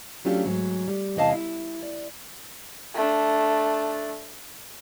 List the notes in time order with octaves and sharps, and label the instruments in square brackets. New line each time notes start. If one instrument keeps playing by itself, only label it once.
[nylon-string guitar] F#3 A3 C#4 D4 F4 G4
G#2 F#3
G3
E2 C3 E3 D#5 F5 A5
E4
D5
[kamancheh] A3 D4